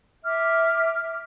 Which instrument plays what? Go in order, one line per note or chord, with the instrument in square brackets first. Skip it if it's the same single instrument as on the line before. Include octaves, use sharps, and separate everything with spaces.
[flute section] E5 D6 F6